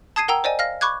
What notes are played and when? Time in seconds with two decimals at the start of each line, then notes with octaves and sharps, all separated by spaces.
0.16 A5 D#6 G#6 C7 D#7
0.28 A#4 F#5 G5 A#5 E6
0.44 C5 D5 D#5 G#5
0.59 F5 F6 A#6
0.81 B5 C#6 D6 F#6 G#6